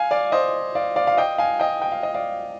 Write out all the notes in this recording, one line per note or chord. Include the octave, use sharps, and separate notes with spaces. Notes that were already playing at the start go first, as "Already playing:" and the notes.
Already playing: F5 G#5
D5 F5
C5 D#5
D5 F5
D5 F5
F5
D#5 G5
F5 G#5
D#5 G5
G5
F5
D#5
D5 F5